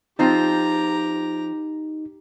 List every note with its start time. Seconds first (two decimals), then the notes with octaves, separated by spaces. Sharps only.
0.19 F3 C4 D#4 F4 G4 A#5